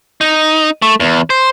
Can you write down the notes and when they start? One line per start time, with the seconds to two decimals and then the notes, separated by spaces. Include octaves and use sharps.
0.21 D#4
0.82 A3
1.00 E2
1.30 C5